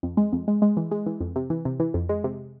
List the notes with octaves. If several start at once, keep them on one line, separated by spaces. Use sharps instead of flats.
F2
G#3
F2
G#3
G#3
E3
G#3
E3
F2
C3
E3
C3
E3
F2
G#3
C3